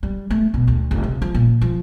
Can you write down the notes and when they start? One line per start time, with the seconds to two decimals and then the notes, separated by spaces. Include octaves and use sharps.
0.03 G3
0.30 A3
0.54 B2
0.67 D2
0.91 F1
1.03 C3
1.22 F3
1.34 A#2
1.61 F3